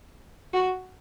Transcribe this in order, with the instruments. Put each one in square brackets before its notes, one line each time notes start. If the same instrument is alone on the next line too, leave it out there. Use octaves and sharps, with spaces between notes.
[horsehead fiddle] F#4